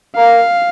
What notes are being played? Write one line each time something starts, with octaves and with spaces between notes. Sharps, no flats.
A#3 F5